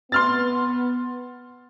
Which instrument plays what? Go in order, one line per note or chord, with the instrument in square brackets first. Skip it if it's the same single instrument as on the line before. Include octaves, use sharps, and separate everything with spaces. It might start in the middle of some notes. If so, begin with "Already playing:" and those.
[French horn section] B3 [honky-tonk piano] C6 F6 A6